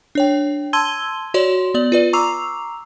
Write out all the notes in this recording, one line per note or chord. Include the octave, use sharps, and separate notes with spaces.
D4 C#5 G5
A5 C6 E6 G#6 D#7 G7
F#4 C#5 D5 C6
B3 D5 F#7
F4 B4 D5
A#5 C#6 D6 E6 C7 F7